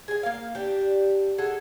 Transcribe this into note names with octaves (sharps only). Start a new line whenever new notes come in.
G#4 G#5
A#3 F5
D4 G4
G#4 A4 F#5